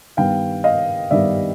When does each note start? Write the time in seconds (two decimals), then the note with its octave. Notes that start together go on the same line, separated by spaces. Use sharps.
0.17 G2 D#3 G3 B3 F5 G5
0.64 D#5 F5
1.11 G2 D#3 G3 B3 D5 E5